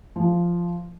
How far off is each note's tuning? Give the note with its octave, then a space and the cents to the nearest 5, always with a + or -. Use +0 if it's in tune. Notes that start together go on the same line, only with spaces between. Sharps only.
F3 -10